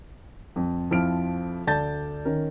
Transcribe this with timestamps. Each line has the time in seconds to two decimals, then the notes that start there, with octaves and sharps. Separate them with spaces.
0.56 F2
0.91 F2 F3 E4 F6 D7
1.67 D2 A4 D5 A5 G6 A6
2.25 D#3 C#4 A#4